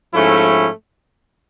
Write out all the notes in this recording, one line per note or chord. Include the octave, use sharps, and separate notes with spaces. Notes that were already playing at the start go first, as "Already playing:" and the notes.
G#2 F3 A3 C#4 E4